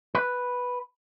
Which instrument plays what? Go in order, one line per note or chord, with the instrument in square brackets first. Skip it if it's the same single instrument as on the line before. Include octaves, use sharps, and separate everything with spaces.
[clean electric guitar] B4